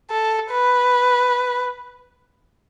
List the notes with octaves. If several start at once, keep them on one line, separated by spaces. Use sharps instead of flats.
A4
B4